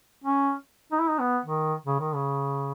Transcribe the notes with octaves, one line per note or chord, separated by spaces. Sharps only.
C#4
D#4
E4
D#4
B3
D#3
C#3
D#3
C#3